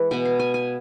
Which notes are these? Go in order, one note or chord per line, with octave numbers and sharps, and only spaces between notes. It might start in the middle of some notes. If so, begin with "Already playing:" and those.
Already playing: E3 G#3
B2 B3 G#5
F5
G#5
G#5